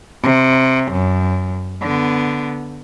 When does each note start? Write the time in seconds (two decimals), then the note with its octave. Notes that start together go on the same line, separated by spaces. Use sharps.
0.23 C3
0.92 F#2
1.82 D3 B3